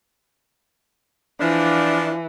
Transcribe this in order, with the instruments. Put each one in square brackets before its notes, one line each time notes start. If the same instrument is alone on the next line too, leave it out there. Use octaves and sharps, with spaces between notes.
[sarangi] E3 [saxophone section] F3 D4